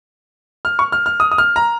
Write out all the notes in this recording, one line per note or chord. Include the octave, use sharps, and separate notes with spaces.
F6
C#6
F6
F6
D#6
D#6
F6
A#5